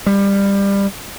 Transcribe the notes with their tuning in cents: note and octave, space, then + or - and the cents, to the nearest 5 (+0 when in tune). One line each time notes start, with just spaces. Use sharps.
G3 +20